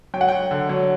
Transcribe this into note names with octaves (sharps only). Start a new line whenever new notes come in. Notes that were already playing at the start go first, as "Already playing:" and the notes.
F#3 G5
F#5
F#3 G5
D3
F#3